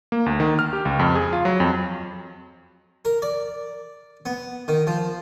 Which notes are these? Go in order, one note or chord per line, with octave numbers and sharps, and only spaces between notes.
A#3
D2
D#3
F6
G4
C#2
F2
G#4
F4
F#3
F2
A#4
D5
B3
D#3
F3